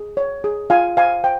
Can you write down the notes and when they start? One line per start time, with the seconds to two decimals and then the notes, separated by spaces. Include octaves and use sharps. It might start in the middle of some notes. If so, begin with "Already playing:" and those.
Already playing: G#4
0.17 C#5
0.44 G#4
0.70 F4 F5 G#5
0.97 C5 F5 G#5
1.24 C5 G5